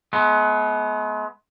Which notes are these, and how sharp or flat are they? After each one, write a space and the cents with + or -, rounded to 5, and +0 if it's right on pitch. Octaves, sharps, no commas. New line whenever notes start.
G#3 +40 B3 +0